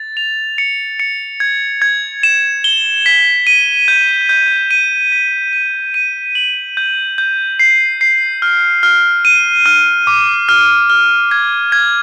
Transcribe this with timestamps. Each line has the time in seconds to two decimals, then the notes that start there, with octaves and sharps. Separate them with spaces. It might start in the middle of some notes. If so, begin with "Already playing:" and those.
Already playing: A6
0.17 F7
0.58 C#7
1.00 C#7
1.40 G#6
1.82 G#6
2.23 E7
2.64 G7
3.06 B6
3.47 D#7
3.88 G6
4.29 G6
4.71 D#7
5.12 B6
5.53 D#7
5.94 D#7
6.35 F#7
6.77 G6
7.18 G6
7.59 C7
8.01 C7
8.42 F6
8.83 F6
9.25 D#7
9.66 F6
10.07 D6
10.49 F6
10.90 F6
11.31 G#6
11.72 G#6